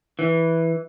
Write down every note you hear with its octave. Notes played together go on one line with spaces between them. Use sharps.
E3